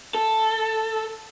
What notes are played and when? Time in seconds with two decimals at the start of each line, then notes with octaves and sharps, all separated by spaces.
0.15 A4